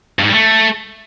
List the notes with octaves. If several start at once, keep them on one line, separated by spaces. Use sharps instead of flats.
G2
G#2
G3
A3